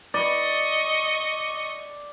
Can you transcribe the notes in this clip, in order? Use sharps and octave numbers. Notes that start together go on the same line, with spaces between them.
D5 D#5 C#6